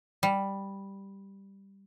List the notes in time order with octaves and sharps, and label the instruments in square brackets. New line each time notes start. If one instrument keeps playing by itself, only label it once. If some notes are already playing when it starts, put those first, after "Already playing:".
[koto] G3